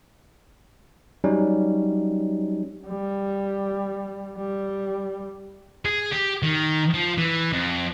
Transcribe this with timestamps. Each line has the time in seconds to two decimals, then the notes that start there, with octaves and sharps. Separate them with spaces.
1.24 F#3 G3 C#4 D#4
2.88 G3
4.37 G3
5.85 G#4
6.13 G4
6.43 D#3
6.94 F3
7.18 E3
7.53 F2